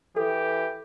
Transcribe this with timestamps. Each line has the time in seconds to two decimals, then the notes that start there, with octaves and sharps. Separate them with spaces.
0.16 E3 G4 A4